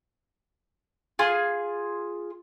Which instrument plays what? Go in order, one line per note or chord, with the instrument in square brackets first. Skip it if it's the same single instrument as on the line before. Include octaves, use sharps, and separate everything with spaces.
[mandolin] F4 G#4